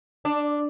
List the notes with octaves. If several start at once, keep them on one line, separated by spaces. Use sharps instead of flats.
D4